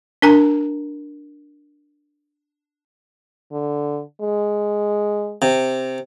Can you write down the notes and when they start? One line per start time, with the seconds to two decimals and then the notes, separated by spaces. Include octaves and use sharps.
0.22 D4 A#4 G#5 A#5
3.52 D3
4.21 G#3
5.42 C3